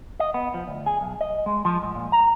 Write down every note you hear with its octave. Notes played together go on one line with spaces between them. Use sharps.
D#5
B3
F3
D2
G#4
B1
D#5
G#3
F3
G#2
A#2
A#5